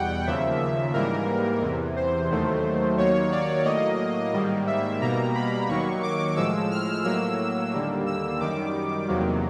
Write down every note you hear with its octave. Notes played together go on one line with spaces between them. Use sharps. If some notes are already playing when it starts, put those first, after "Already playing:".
Already playing: E2 B2 G3 F#5 G5
D#2 C#3 F3 A#3 E5
E5
G#2 E3 G3 A#3 A#4
E2 C3 E3
C5
D#2 D#3 F#3 A3
D#2 D#3 F#3 A#3 C#5
D5
A2 F#3 A#3 D#5
G#2 D#3 G3 A#3
E5
B2 G3 A#3 A#5
B5
D#2 D#3 F#3 A#3 C#6
D6
A2 F3 G#3 E6
F6
A2 F#3 A#3 E6
D#2 D3 G3 A#3
E6
F#2 D#3 G3 D6
E2 C3 D#3 F#3 A#3